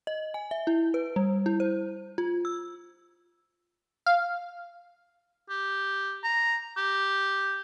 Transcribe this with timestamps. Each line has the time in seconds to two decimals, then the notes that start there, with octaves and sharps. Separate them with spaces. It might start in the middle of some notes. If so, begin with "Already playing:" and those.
0.07 D#5
0.34 G#5
0.51 E5
0.67 E4
0.94 B4
1.16 G3
1.46 E4
1.60 C5
2.18 F4
2.45 E6
4.06 F5
5.50 G4
6.23 A#5
6.77 G4